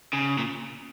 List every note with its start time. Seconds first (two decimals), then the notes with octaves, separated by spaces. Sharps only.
0.13 C#3
0.38 A#2